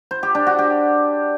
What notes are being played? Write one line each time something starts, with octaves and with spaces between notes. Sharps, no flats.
C5
G4
D4
F#4
G4